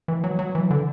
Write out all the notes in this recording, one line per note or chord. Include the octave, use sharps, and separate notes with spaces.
E3
F#3
F#3
E3
D3